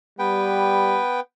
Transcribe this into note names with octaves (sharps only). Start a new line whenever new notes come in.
G3 B3 B4 G5